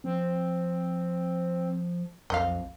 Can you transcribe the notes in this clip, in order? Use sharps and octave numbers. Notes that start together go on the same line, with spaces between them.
F3 C4
B1 F2 D#5 F5